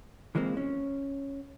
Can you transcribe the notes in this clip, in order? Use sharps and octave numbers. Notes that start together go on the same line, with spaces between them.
E3 F3 G#3 A#3 C4
C#4